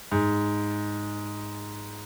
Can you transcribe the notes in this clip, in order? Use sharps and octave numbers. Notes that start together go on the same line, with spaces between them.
G#2